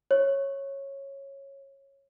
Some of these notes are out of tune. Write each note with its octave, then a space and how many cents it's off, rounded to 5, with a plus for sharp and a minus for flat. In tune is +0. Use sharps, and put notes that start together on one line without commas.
C#5 -15